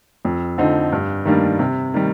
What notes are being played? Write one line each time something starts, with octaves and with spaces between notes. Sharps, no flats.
F2
D3 F3 C4 D#4
G2
D#3 G3 A#3 D4
C3
D#3 G3